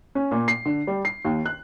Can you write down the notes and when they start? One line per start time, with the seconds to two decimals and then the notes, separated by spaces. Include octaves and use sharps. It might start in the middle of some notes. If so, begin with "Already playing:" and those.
0.15 C#4
0.31 A#2
0.48 C7
0.65 D3
0.87 G3
1.05 C7
1.25 D#2
1.46 F#6